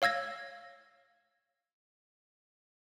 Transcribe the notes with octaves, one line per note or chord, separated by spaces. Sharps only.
C#5 F5 E6 G#6 A#6